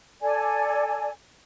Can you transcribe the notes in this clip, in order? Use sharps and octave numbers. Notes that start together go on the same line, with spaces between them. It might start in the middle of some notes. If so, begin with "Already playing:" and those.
A4 D5 G#5